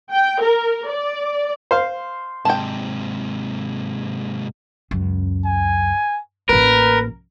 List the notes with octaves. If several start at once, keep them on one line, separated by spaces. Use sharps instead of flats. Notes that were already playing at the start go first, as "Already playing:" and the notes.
G5
A#4
D5
C5 F5
G#2 C3 G5 A5
C#2 F#2
G#5
A1 A#3 A#4 B4